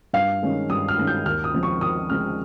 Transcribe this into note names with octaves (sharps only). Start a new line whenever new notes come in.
G2 F5
D#3 G#3 C#4
G2 D#6
F6
D#3 G#3 C#4
G6
D#2 F6
D#6
C#3 F3 G#3 C4
C#6
D#2 D#6
C#3 F3 G#3 C4 F6